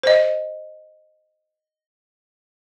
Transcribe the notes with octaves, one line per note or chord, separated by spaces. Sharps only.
C5 D#5